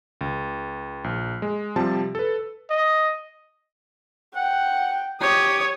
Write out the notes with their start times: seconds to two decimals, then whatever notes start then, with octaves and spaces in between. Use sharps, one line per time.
0.21 C#2
1.04 A#1
1.42 G#3
1.76 C3 F3 G3 A5
2.15 A4 B4
2.70 D#5
4.36 F#5 G5
5.21 G4 C#5 D#6